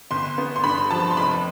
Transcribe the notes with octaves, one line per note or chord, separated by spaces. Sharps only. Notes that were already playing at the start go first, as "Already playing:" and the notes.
G1 C6
B3
C6
G2 B5
F3 A5
C6
F1 B5